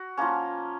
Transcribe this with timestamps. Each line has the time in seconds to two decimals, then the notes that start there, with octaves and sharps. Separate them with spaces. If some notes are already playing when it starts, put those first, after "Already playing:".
Already playing: F#4
0.17 F3 A#3 C#4